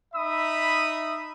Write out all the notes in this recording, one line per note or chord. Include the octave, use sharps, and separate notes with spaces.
D#4 E5 B5 D#6